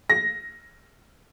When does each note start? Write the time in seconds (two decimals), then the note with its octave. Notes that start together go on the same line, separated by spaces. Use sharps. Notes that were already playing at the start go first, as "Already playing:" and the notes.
0.10 A#6